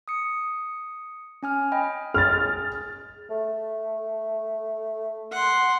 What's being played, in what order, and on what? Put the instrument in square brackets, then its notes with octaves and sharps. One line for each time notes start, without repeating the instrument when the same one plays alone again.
[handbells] D#6 C#7
C#4 G#5 F6
D#5 G5 B5
[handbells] G#4 [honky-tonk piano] F6 A6
[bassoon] A3
[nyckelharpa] F#5 C6